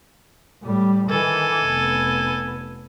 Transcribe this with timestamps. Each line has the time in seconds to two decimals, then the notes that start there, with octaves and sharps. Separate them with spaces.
0.63 A2 G3
1.10 D#3 E3 A4 G#5
1.63 F1 B3